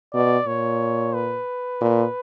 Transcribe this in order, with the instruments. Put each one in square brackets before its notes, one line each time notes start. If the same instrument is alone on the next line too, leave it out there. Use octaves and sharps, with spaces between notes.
[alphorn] B2 [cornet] D5
[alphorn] A#2 [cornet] C#5
[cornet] B4
[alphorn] A#2